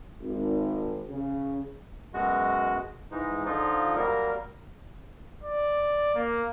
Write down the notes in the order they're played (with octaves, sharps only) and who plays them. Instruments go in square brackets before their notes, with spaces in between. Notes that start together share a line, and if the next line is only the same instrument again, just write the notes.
[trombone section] G#1
C#3
[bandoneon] F#2 B2 G#3 F#4
G#2 E3 G#3 D#4
D3 F3 D#4 F4
F#3 G3 A#3 A#4
[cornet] D5
A#3